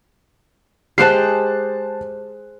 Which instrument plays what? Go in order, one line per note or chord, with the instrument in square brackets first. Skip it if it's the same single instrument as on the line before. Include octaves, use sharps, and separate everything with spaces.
[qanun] G#3 G4 C5 [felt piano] A5 F#6 C7